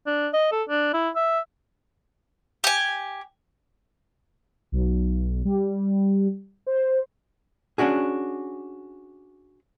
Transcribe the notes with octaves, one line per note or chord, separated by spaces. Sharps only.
D4
D#5
A4
D4
E4
E5
G4 G#5
B1
G3
C5
C#4 D4 F#4 G#4